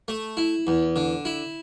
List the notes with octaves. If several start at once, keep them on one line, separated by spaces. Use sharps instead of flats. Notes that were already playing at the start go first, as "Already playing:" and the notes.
A3
E4
E2
D3
E4